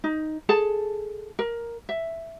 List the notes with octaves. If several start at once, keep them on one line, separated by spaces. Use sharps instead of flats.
D#4
G#4 A4 A5
A#4
E5